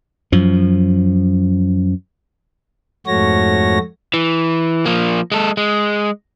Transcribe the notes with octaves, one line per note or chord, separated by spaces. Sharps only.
F#2 F3
F2 G#2 A3 F#4 C#5 A#6
E3
F3 A#3
G#3 A4
G#3